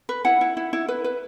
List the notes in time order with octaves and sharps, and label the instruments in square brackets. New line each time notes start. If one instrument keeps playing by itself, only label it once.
[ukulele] B4
E4 F#5
E4
E4
E4
B4
B4